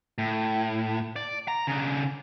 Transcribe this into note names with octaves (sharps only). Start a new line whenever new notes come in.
A2
D5
A#5
C#3 D4